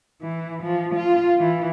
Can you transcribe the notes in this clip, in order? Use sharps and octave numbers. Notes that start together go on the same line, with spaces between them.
E3
F3
F4
E3